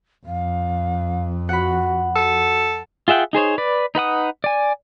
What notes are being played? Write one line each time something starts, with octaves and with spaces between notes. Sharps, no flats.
F2 F5
F#4 F#5 B5
F#4 A4
F4 G#4 E5 F#5 G5
D#4 G#4 C5 C#5
B4 D5
D#4 B4 F#5 D#6
D5 G#5